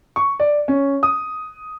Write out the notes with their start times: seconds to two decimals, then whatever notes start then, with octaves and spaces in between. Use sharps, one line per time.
0.16 C#6
0.40 D5
0.68 C#4
1.03 D#6